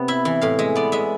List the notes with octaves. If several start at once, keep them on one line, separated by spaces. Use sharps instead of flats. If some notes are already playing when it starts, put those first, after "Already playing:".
Already playing: C3 B3
E4 E5
E3
A2 F5
G#3 E5
B3 D5
G#3 E5